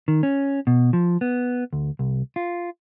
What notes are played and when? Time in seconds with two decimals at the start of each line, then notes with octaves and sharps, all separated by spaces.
0.08 D#3
0.23 C#4
0.67 B2
0.93 F3
1.21 B3
1.73 D2
1.99 C2
2.36 F4